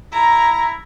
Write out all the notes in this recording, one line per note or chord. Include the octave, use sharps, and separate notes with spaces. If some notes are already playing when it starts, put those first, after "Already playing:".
E4 A#5